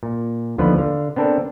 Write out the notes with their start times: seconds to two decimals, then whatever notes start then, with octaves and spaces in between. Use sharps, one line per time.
0.03 A#2
0.58 D#2 D3 F3 B3 B4
0.78 D3 F5
1.16 B3 C4 D4 A4 A#4